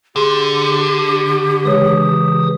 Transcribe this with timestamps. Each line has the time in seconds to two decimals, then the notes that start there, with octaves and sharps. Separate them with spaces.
0.16 D3 G4 G#4 C6
1.65 C#3 E3 G#3 C#5 D#6